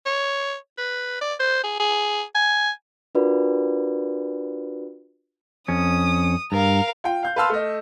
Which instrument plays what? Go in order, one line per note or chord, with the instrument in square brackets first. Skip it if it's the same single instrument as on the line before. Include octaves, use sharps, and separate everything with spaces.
[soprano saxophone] C#5
B4
D5
C5
G#4
G#4
G#5
[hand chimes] D4 F4 F#4 A#4 B4 D5
[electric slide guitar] F2 C#4 [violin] D#6
[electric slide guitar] G2 [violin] A#4 F5
[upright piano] F4 G5
F5 G6
B4 F5 A5 C6 E6 F6
A3 D#5